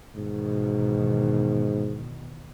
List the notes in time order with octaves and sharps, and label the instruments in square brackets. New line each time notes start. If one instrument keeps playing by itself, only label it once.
[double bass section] E2 B2 D#3 [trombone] G#2